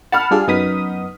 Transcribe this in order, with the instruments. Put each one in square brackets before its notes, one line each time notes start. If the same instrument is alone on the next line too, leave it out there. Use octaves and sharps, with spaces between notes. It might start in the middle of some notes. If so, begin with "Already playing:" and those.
[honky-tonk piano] F#5 B5 F6 [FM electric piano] A5
[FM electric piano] G3 D4 A4 [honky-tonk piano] F4 G#4
[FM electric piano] F#2 B3 D#6 [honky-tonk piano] D#4 B6